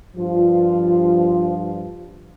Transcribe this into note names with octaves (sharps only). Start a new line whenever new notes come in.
G2 F3 F4